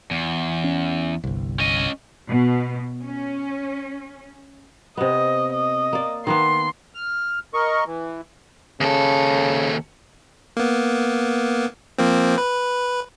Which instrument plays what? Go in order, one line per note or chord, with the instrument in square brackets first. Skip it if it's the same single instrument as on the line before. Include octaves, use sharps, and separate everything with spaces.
[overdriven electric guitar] E2
[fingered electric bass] C#4
G1 C2
[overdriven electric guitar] C#4 D#5
[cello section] B2
C#4
[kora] C3 B3 [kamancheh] D#5
[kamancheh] D#5
[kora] A#3 D5
[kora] D#3 A#3 B3 [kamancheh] C6
[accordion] F6
A#4 D#5 C#6
E3
[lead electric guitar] D#2 A4 [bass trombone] C#3
[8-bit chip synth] A#3 B3
F3 A#3 C4
B4